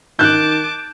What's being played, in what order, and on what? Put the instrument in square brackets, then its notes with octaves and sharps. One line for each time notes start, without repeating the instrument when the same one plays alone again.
[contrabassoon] D#3 [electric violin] A5 D6 [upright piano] F#6 G6